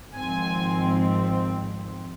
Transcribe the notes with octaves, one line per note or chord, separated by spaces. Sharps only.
G#1 G#2 F3 C4 G#5